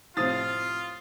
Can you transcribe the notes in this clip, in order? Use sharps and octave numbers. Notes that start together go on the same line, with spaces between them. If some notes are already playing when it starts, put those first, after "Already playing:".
A2 C3 F3 F4 F5 D#6 A6